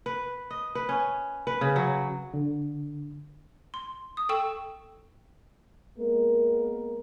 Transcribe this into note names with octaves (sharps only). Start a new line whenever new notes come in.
B4
D#5
B4
C#4
B4
C#3
F#3
D3
C6
D#6
A4 G5 C#6 E6 E7
G#3 A#3 B3 A#4